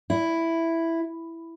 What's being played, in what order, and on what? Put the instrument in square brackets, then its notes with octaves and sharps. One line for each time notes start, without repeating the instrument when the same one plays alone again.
[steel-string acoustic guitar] E4